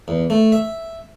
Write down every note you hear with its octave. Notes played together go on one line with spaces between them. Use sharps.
E2
A3
E5